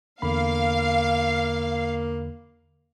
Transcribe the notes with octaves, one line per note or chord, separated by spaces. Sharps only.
E2 D3 A#3 F5 B5